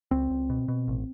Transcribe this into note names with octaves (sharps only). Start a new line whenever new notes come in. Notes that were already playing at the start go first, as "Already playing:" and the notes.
C#2 C4
C#2
B2
B2
A1